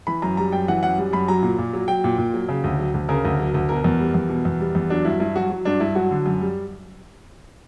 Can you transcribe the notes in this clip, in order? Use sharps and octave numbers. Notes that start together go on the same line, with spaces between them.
E3 B5
F#2 A#5
G3 A#5
F#2 G5
E3 F#5
F#2 F#5
G3
F#2 B5
F#3 A#5
A#2
A#2
F#3
F#3 G5
A#2
A#2
F#3
C#3
D2
F#3
D2
C#3 A#4
D2
F#3
D2
B2 A#4
E2
G3
E2
B2
E2
G3
E2
F#3 D4
G2 E4
G2 E4
F#3 F#4
F#3
G2 D4
G2 E4
F#3 F#4
D3
F#2
G3